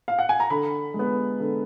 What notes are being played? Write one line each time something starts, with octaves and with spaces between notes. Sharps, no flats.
F5
F#5
G#5
A#5
D3 B5
G#3
B3
D3